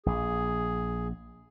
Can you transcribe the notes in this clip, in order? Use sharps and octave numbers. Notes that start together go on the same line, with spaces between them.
A#1 G#4